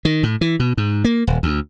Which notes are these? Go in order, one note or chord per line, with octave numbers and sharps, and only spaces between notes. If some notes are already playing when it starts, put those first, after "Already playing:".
D#3
A2
E3
B2
G#2
A#3
D#1
D2